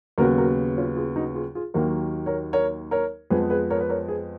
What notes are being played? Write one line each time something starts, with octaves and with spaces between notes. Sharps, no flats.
D#2 C#3 F#3 B3 F#4 A#4
F#4 A#4
C#4 F4
F4 G#4
D#4 F#4
F4 G#4
F4 G#4
D#2 D#3 F#3 A#3 F#4 A#4
A#4 C#5
A#4 C#5
A#4 C#5
F2 F3 G#3 B3 G#4 B4
G#4 B4
A#4 C#5
B4
A#4 C#5
G#4 B4